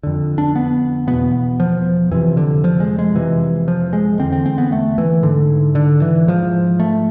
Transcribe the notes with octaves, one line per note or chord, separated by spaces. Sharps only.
F2 D3
D4
B3
E2 B2 B3
F3
F2 C3 E3
D3
F3
G#3
G#3
F2 C3 E3
F3
G#3
E2 D3 C4
C4
C4
B3
A3
E3
G#2 D3
D3
E3
G#2 F3
A3